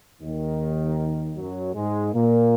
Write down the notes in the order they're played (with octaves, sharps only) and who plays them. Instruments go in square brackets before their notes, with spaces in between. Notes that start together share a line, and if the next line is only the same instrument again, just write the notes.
[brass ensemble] D#2 D#3
F#2 F#3
G#2 G#3
A#2 A#3